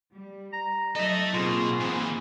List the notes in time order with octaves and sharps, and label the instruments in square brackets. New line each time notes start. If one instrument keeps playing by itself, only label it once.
[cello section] G3
[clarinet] A#5
[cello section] F#3 D#4 [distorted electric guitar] A4 E5 [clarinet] D#5
[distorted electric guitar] B2 [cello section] A#3 C4 G#4 [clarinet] F4
[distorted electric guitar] G#2 E3